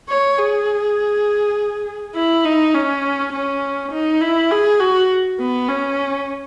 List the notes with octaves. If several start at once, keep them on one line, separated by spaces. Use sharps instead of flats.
C#5
G#4
E4
D#4
C#4
C#4
D#4
E4
G#4
F#4
B3
C#4